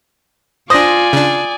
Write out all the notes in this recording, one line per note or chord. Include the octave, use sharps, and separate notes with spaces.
D4 F4 C5 D5 G#5 D#6 A#6
C#3 D4